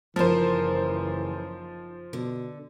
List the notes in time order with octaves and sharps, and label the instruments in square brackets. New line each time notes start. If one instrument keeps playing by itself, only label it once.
[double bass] F#1 [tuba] E3 [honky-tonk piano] F3 C5 [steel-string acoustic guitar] D#4 A#4
[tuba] B2 [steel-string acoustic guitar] D3